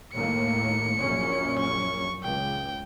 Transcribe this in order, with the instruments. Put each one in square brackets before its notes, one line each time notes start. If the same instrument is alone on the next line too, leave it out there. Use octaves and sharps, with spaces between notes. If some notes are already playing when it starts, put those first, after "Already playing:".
[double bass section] D#2 A2 A#3 [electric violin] C#7
[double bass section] A#1 F#2 C#4
[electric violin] C#6
[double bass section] C#2 [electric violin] G5